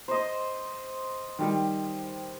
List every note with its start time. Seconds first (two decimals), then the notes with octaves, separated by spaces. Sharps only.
0.08 C5 D#5
1.39 D#3 G3